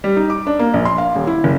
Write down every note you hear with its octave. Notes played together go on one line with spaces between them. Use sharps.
G3
D#4
D6
D4
A#3
A#1
C6
F5
D#1
E4
F#1